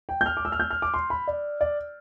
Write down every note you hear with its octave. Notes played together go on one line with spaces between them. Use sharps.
G5
G6
F6
D6
E6
F6
G6
F6
D6
C6
B5
D5
D5